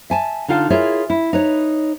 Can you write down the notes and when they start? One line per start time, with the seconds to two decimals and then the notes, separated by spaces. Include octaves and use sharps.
0.10 E5 G#5 A5
0.48 D3 D#4 F4 F5 F#5 A5
0.70 E4 F4 G#4 A#4 C#5 E5
1.10 E4
1.33 D#4 B4 C#5